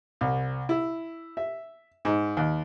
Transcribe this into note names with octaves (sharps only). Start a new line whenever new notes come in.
C2
E4
E5
G#2
D#2